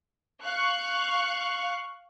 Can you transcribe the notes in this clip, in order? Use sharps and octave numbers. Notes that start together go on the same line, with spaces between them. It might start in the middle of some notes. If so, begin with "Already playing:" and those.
F5 C#6 F#6